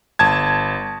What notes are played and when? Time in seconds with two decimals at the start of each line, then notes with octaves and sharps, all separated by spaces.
0.19 G1 A5 G#6